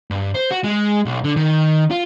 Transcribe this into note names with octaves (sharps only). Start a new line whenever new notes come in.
G2
C5
F#4
G#3
B1
D3
D#3
F4